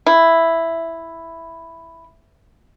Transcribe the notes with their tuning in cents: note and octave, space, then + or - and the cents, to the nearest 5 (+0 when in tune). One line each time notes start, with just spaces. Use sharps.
E4 +0